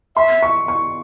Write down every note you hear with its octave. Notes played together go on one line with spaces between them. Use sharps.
E5 C6
C#6
C#6